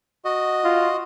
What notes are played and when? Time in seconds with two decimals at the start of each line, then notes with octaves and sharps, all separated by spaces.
0.25 F#4 D#5
0.64 F4